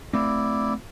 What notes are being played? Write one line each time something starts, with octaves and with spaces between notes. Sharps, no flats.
A3 C4 E4 D5